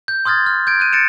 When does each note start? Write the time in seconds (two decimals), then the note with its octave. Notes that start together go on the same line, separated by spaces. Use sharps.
0.08 G6
0.25 C6 D#6 F6 G#6 A6
0.46 F6
0.67 G6 G#6 D7
0.80 F#6 D#7
0.93 A6 C#7 D7 E7